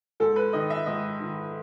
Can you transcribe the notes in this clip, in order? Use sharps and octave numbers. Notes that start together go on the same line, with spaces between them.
G#2 A4
B4
D#3 D#5
E5
G#2 D#5
D#3